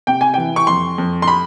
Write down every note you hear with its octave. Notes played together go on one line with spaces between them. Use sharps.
C3 G5
G#5
E3 G5
C#6
F2 C6
F2
C6
B5